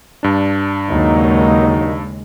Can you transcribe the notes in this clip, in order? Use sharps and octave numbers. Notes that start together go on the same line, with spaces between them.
G2 D4
D#2 C#3 F#3 G#3 A#3 D#4